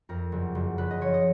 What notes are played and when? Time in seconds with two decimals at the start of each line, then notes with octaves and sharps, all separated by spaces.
0.09 F2 A#4
0.32 F#1
0.55 F#1
0.78 F#1 B4
0.91 D#5
1.01 F3 C#5
1.14 D#5